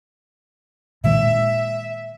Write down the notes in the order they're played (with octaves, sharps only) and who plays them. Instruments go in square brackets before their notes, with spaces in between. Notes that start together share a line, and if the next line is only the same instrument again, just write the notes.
[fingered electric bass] A#2 D#3 G#3 [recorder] E5